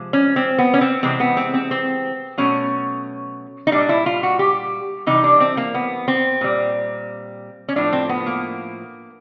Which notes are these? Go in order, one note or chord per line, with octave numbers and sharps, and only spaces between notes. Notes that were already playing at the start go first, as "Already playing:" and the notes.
Already playing: C3 F3 G#3
C#4
C4
B3
C#4
C4
C3 E3 G#3 C4
B3
C4
C4
C4
B2 F#3 A3 C#4
D#4
A#2 G3 D4
E4
F4
F#4
G4
C3 E3 G3 D#4
D4
C4
A#3
B3
C4
A#2 G3
C#4
A2 F3 A3 D4
C4
B3
A#3